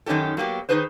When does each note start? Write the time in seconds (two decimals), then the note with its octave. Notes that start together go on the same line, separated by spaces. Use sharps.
0.06 F#2 D#3 C#4 D#4 G4 A4
0.37 F#3 A#3 B3 G4
0.69 D#3 F3 D#4 G#4 B4 C5